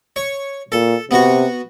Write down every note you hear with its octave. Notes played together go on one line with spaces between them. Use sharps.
C#5
A#2 A4
C3 B3 F#4